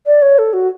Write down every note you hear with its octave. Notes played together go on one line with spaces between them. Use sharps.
D5
C#5
A4
F#4